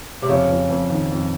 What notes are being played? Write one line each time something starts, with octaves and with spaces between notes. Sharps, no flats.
C3
F2 C#3
F2
F2
D#3
F2